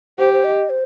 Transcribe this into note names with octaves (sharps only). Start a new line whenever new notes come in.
G4 C5
C5
D#5
C5